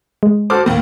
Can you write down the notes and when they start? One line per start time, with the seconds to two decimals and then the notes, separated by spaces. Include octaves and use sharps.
0.23 G#3
0.50 F#4 A4 C5 D6 F6
0.66 D#2 A2 A#3